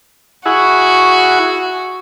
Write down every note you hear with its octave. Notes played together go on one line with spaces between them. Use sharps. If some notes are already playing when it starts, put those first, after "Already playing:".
E4 F#4 G#4 F#5